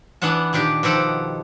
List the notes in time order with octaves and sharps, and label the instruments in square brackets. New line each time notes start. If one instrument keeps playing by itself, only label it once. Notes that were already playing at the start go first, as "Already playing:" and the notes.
[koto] E3 B3 D4 F#5 A5
A#2 D#3 D4 G4
B2 D#3 F3 G4 A4 F#5